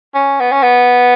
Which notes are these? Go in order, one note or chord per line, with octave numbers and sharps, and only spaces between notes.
C#4
B3
C#4
B3